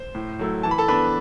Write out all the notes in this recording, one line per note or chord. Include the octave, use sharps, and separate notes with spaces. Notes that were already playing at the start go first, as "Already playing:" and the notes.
Already playing: C5
A2
F#3 A3 E4
E3 A5
B5
A4 A5
B3 D4 B4 B5